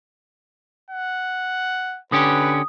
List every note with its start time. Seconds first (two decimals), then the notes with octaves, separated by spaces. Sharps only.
0.90 F#5
2.12 D3 C#4 G4 B4 D#6